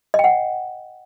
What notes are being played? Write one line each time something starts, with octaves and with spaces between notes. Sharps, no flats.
D#5
G5
F#5